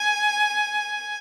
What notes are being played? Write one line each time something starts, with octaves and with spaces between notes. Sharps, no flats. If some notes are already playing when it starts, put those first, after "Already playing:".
Already playing: G#5